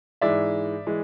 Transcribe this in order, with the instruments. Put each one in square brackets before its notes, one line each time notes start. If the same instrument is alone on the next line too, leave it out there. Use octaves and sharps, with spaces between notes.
[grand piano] G#2 E3 G#3 D5 E5
E3 G#3